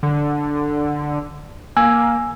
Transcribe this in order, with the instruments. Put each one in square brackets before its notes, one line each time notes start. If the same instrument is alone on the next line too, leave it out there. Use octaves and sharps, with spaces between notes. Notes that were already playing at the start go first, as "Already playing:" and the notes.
[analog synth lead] D3
[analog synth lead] A#3 [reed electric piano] G#5 E6